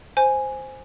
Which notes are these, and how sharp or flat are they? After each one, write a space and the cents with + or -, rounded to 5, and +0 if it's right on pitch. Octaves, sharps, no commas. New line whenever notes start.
C5 +0 G#5 +0